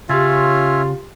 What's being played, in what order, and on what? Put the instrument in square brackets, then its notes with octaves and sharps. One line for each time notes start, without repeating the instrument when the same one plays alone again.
[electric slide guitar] C#3 [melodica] C#4 C#5 E5 [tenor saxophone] F4 [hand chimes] G4 C6 A6